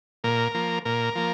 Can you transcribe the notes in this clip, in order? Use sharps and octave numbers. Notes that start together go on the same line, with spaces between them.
A#2 A#4
F3 A#3
A#2 A#4
F3 A#3